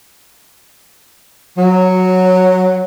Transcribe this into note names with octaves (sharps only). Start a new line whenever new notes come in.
F#3